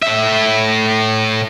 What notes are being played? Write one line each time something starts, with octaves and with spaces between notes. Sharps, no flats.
A2 E5